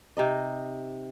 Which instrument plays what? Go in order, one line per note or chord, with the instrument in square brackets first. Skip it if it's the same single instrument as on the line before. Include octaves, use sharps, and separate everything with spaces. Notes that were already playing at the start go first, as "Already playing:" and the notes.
[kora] C3 D#4 D#5